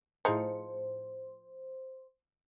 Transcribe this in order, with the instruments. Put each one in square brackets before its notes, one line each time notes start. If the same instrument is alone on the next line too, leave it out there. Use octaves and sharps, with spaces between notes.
[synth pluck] A2 G#4 C#7 [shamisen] F3 D#4 [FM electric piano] C5